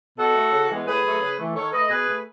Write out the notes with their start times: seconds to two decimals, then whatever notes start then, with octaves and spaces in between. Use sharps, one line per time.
0.17 B2 F#4 A4
0.34 A3
0.52 C#3
0.69 E3 G#3 B3
0.86 A2 G#4 B4
1.04 F#3 A3
1.21 C#3
1.37 E3 A3
1.54 D#3 A4 C#5
1.72 A3 B4 D#5
1.89 B2 G#4 B4
2.07 A3